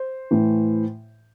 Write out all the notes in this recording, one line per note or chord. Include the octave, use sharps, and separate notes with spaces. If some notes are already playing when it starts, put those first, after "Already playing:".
Already playing: C5
A2 E3